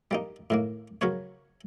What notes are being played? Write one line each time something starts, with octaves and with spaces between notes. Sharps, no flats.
G3 A#3 D#4
A2 D#3 A#3
C#3 F#3 A#4 B4 C#5